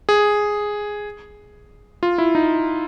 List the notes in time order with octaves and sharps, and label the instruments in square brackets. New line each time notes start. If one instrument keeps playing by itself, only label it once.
[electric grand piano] G#4
F4
E4
D#4